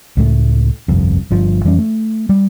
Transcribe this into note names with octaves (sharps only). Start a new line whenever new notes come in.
C#2 A2 A3
G1 C2 F2
G1 G2 F3
F2 E3 G3 C#4
A3
G3